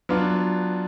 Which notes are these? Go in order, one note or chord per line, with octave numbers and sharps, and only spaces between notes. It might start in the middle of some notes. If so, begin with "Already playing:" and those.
F#3 B3 D4 F4